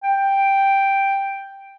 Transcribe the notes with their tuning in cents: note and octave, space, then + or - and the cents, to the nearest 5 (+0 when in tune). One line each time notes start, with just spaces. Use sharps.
G5 +5